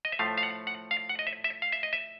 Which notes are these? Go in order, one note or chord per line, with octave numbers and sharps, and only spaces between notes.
D#5
E5
A2 F3 A3 F5
F5
F#5
F#5
F5
F#5
D#5
E5
E5
F5
E5
D#5
E5